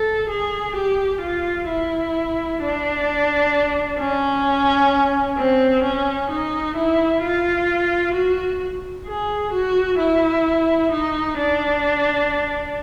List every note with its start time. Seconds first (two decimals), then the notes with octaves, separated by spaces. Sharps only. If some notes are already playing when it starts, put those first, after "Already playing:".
Already playing: A4
0.30 G#4
0.75 G4
1.22 F4
1.69 E4
2.61 D4
3.98 C#4
5.38 C4
5.83 C#4
6.30 D#4
6.76 E4
7.22 F4
8.14 F#4
9.07 G#4
9.52 F#4
9.98 E4
10.91 D#4
11.38 D4